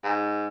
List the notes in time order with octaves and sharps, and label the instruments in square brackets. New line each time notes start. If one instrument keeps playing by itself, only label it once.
[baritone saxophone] G#2